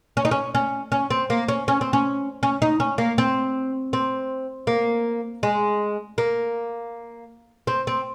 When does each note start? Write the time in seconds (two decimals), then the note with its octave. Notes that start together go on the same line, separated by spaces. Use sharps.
0.17 C#4
0.25 D#4
0.31 C#4
0.55 C#4
0.92 C#4
1.11 C4
1.30 A#3
1.48 C#4
1.68 C#4
1.81 C4
1.93 C#4
2.43 C#4
2.62 D#4
2.80 C#4
2.98 A#3
3.18 C4
3.93 C4
4.67 A#3
5.43 G#3
6.18 A#3
7.67 C4
7.87 C4